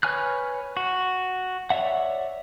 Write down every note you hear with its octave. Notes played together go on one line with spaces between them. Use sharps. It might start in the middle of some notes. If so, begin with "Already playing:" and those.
B4 C#5 G#5 F6 F#6
F#4
C#5 D5 E5 F#5